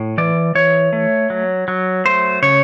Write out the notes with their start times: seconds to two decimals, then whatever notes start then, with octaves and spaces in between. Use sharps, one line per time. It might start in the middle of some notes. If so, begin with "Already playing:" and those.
Already playing: A2
0.18 E3 D5
0.55 E3 C#5
0.93 A3
1.30 F#3
1.68 F#3
2.05 A3 C5
2.42 C#3 C#5